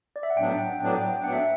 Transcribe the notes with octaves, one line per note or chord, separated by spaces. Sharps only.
D5
E5
F#5
A2 F#3 B3 D4 G5
G5
A2 F#3 B3 D4 G5
G5
A2 F#3 B3 D4 F#5
E5